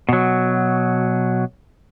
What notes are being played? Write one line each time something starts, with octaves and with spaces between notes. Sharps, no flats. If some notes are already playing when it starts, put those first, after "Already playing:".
B2 F#3